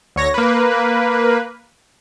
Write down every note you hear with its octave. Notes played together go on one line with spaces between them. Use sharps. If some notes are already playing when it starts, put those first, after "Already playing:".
D2 C#5 A#6
A#3 B4